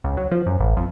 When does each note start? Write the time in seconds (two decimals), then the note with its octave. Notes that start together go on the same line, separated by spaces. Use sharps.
0.04 C#2
0.17 F#3
0.32 F3
0.46 F#2
0.59 A1
0.77 F2